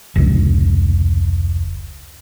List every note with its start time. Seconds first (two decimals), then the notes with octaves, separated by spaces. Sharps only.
0.16 F1 C#2